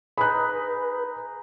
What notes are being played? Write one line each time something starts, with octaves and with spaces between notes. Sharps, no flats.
D#4 G#4 B4 B5 F#6